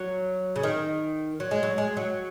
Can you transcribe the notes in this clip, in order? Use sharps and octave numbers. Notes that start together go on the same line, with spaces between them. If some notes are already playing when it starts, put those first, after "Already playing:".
Already playing: F#3
C#3
D#3
F#3
G#3
F#3
G#3
F#3